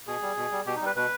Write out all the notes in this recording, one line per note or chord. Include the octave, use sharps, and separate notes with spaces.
B2 G#4
G3
B2
G3
B2 G4
D#4
G3 B4
B2 B4